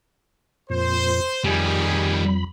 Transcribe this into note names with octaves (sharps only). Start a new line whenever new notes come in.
F2 A#2 C5
F2 D#3 G3 G4 G#4 G#5 B5